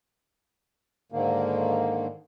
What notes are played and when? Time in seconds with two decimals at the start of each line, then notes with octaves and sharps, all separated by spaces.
1.12 G#2 D3 D#3 A#3